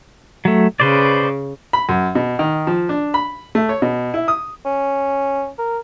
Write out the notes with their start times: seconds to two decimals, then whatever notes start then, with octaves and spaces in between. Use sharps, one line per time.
0.45 F#3 A3
0.80 C#3 B4 C5 D5
1.73 B5
1.89 F#2
2.15 B2
2.39 D#3
2.67 F3
2.89 D4
3.14 B5
3.55 A3
3.69 C#5
3.82 B2
4.14 E4
4.28 D#6
4.65 C#4
5.59 A#4